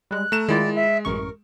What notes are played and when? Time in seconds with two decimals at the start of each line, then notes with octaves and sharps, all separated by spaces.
0.11 G3 G#3 F#6
0.32 A3 A#5 E7
0.49 D#3 G#3 E4 F4 D5
0.75 E5
1.05 A1 F#2 A#4 C#6